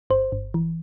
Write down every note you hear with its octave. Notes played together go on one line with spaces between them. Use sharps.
G1 C5
G1
E3